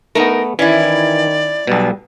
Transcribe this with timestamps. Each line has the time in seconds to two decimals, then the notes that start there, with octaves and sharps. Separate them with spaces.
0.15 A3 B3 D#4 A#4
0.59 D#3 E3 C#4 E4 D5
1.67 B1 B2 G3